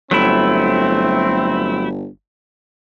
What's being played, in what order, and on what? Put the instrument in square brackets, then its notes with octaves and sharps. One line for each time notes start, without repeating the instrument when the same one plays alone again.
[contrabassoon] G1 [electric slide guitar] F#3 A3 E4 [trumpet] C4